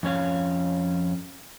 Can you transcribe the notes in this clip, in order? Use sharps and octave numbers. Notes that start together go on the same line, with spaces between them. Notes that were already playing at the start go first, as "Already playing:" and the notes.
F2 C#4 C#5 F5